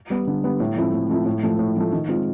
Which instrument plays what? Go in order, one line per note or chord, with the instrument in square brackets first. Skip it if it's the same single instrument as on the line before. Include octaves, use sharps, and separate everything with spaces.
[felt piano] G3 B3
D3
G3 B3
A2
F3 A3 C4 E4
A2
F3 A3 C4 E4
A2
F3 A3
A2
F3 A3
D#3
G#3 C4 F4